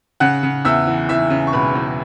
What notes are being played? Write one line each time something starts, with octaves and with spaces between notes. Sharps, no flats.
C#3 F#5 F#6
C#3
E2 E5 E6
E3
E3 E5 E6
C#3
C#6
E1 B4 B5
E2